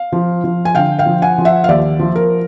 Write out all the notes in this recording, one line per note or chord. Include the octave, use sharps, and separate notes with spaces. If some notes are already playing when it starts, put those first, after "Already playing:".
Already playing: F5
F3
F3
G#5
D3 F5 G5
F5 G5
F3
F#5 G#5
F3
E5 F#5
F5
D#2 D5 E5
F3
A#4